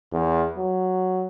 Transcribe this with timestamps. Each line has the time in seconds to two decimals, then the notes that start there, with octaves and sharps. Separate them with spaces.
0.12 E2
0.57 F#3